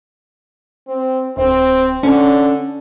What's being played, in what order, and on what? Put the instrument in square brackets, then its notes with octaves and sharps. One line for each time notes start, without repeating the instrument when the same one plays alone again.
[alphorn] C4
[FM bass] D1 [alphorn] C4
[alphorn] D3 [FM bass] C#4